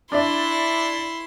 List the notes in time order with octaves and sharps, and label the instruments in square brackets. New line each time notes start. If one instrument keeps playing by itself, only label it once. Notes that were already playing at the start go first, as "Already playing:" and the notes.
[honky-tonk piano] D4 D5 E5 [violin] E4 C6